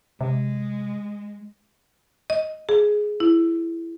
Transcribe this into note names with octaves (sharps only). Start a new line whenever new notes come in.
C3 G#3
D#5
G#4
E4